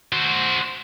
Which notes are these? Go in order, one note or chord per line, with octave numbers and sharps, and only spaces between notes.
F#4 C5